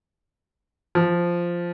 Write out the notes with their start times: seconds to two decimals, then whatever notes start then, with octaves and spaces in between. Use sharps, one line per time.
0.95 F3